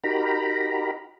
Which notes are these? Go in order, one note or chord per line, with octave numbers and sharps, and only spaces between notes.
D#4 F#4 G4 A#4 A#5 B5